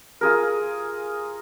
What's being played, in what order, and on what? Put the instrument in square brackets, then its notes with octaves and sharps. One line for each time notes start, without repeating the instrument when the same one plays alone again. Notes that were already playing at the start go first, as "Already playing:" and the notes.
[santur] F4 G#4 A#4